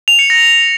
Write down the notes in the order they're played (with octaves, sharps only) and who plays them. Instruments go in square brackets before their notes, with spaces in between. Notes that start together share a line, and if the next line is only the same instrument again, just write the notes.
[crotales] F7
C#7
A#6